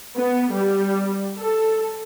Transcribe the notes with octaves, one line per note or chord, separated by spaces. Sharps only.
B3
G3
A4